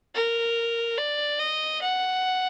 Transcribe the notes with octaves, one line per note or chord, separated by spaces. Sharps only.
A#4
D5
D#5
F#5